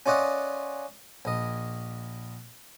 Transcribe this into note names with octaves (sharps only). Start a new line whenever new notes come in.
C#4 F4 D5 D#5 F#5
A#1 D#5